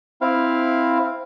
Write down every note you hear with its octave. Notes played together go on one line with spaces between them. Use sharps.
C4 E4 F5